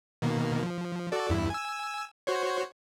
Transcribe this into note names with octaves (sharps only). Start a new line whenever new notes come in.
B2 D#3 A#3
F3
F#4 A4 D5
E2 G2 E4
G#5 E6
F#4 C5 C#5